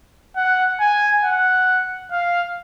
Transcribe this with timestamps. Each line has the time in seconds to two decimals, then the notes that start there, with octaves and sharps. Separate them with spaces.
0.37 F#5
0.80 G#5
1.23 F#5
2.11 F5